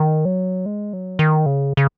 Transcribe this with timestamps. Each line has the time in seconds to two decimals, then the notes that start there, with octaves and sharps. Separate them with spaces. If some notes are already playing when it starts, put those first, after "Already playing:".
Already playing: D#3
0.25 F#3
0.66 G#3
0.93 F#3
1.19 D#3
1.46 C#3
1.77 C#3